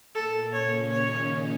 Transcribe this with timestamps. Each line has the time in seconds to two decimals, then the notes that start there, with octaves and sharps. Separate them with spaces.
0.15 A#2 A#3 A4
0.53 C#3 C#4 C#5
0.91 D#3 D#4 C#5